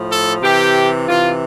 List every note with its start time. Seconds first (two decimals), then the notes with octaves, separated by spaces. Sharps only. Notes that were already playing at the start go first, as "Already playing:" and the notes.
Already playing: A2 F3
0.09 A4
0.41 C3 E3 G4
1.07 C3 E3 F4